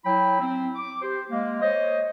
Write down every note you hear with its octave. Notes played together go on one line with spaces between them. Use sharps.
F#3 E4 G5 B5
C4
D6
G4 C5
G#3 A#3
C5 C#5 D#5